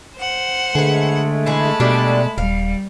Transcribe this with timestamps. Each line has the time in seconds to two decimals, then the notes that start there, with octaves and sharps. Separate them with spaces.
0.18 C5 F#5
0.75 D3 G#3 A3 G#4 B4
1.46 E3 G#4 A5 B5
1.80 B2 G3 D4 D5
2.38 D#1 G3 F5